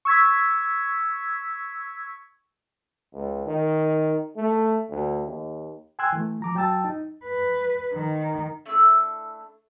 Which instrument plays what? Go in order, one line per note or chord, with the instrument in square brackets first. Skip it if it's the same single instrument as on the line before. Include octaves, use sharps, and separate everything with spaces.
[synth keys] C#6 E6 G#6 B6
[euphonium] C#2
D#3
A3
D2
D#2
[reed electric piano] G5 G#5 C6 E6 F#6 G#6
E3 A3
F3 A#5 D6
F#3 G5 A5 E6 A6
D#4
[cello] B4
D#3
[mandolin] A3 D4 E4 E6